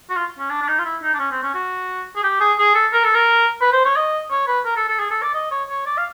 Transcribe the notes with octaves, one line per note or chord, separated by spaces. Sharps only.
F#4
F4
C#4
D4
D4
D#4
F4
E4
D#4
D4
C#4
C4
C#4
F#4
G#4
G4
G#4
G#4
A4
A#4
A4
A#4
B4
C5
C#5
D#5
C#5
B4
A#4
A4
A4
G#4
A4
D5
D#5
C#5
C#5
D5
F5